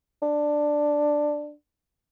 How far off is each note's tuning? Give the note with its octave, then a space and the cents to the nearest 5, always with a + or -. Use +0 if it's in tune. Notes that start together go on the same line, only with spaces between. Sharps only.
D4 +5